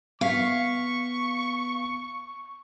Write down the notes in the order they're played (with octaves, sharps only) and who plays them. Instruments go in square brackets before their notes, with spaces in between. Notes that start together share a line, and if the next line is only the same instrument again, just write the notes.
[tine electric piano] B3 B6 [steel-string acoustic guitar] F5 [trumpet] C#6